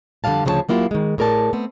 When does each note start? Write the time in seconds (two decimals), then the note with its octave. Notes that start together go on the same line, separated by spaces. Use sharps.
0.24 F2 D3 F3 G3 F5 A5
0.45 D2 C#3 F3 C5 C#5 A5
0.69 F#3 A#3 E4 F4 G4
0.91 D#3 G#3
1.18 A2 G#4 A#4 D5 A5
1.53 A3 B3 C4